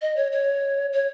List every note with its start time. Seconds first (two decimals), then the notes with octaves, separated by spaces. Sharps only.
0.02 D#5
0.16 C#5
0.32 C#5
0.93 C#5